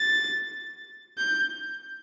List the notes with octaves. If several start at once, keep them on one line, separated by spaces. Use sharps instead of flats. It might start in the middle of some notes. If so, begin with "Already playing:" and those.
Already playing: A6
G6